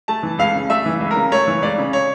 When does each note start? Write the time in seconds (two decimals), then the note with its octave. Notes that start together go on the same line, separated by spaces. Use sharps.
0.08 A3 A5
0.23 E3
0.38 C#2 F5
0.54 C#3
0.70 A3 E5
0.86 E3
1.00 C#2
1.11 A#4
1.16 C#3
1.32 A3 C#5
1.47 E3
1.62 C#2 D5
1.78 C#3
1.93 C#5